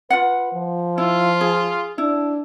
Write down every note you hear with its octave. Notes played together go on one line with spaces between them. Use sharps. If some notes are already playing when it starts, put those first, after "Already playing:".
F4 B4 F#5
F3
E4 F4
G#4
D4 E4